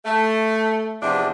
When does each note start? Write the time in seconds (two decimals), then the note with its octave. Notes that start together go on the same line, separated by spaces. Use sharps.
0.05 A3
1.01 E2 C3 F3 D4